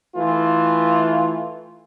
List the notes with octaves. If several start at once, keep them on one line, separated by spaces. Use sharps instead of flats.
E3 A3 F4